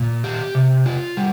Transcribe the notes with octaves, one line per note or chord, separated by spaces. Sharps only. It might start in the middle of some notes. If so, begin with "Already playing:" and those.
Already playing: A#2
G4
C3
F4
G3